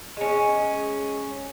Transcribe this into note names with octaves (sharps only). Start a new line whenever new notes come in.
G#3 C#4